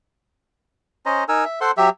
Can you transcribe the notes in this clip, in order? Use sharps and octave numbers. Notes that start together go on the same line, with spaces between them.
C#4 C5 D#5 A#5
D#4 A#4 G#5 E6
E5
A4 C5 F#5 C6
F#3 G4 E5